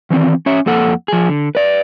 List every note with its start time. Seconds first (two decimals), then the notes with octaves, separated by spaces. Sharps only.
0.10 D#3 E3 A#3 C4
0.46 C#4 C#5 E5
0.66 F2 A#3 A4 F#5
1.08 F3 G#4
1.29 D3
1.55 B4 D5